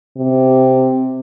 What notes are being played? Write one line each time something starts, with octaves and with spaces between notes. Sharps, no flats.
C3